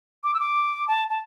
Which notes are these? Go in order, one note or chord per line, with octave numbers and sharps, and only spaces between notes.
D6
E6
D6
A5
A5